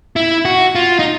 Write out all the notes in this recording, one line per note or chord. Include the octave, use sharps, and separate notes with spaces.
E4
F#4
F4
D#4